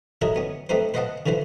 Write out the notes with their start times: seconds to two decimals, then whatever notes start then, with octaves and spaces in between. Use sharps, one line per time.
0.22 E4 F#4 A4 A#4 C#5 D#5
0.36 B3 C#4
0.69 A3 C4 D#4 B4 C5
0.94 B4 C5 D#5 F5 F#5 A5
1.26 D3 E3 F3 B4 C5